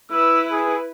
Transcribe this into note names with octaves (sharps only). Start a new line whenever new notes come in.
E4 B4 E6
G#4